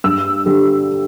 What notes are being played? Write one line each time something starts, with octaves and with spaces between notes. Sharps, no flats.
G2 E6
D3 G3